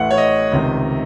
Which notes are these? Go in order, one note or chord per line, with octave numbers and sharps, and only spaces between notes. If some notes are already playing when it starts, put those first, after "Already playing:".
Already playing: A1 A2 E3 F#5
C#5
D#5
C#2 C3 D#3